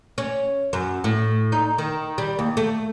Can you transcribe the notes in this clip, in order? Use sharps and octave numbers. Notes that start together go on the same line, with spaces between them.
C#4
F#2
A2
D#4
D#3
G3
D#2
A3